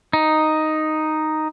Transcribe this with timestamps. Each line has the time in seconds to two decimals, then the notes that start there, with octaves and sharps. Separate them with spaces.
0.13 D#4